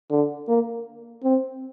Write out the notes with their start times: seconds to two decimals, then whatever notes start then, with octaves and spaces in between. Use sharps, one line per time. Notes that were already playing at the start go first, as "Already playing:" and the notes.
0.11 D3
0.48 A#3
1.24 C4